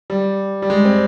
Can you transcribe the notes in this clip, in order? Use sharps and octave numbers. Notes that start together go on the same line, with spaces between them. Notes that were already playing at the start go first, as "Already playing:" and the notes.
G3
G3
G#3
C4